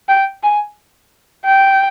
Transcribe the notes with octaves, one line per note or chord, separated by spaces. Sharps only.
G5
G#5
G5